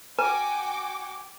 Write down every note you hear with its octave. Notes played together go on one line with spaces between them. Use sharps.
F#4 B4 G5 G#5 D6